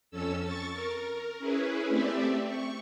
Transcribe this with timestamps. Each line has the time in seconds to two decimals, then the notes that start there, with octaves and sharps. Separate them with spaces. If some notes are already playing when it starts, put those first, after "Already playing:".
0.11 F2 C#4 A4 E6
0.42 C#6 A6
0.73 A#4
1.39 C#4 E4 G#4 B4
1.89 A3 C4 G4 D5 E5
2.48 C#6